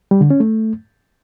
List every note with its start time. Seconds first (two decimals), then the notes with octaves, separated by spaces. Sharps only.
0.11 G3
0.21 D3
0.31 C#4
0.40 A3